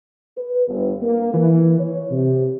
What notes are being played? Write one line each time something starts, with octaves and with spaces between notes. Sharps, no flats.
B4
G1
A#3
E3
C#5
C3